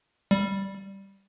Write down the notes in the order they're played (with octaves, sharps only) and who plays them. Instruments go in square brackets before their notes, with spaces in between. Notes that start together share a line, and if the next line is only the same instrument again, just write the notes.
[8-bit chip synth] G3